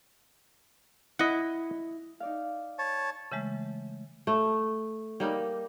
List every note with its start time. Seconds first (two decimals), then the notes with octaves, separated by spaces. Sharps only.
1.19 E4 D#5 F#5
2.20 D#4 D5 F5
2.79 C#5 A5
3.32 C#3 E3 G#3 A3
4.27 A3
5.20 G3 A#3 D#4